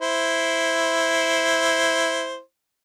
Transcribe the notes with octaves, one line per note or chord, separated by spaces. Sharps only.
E4 C5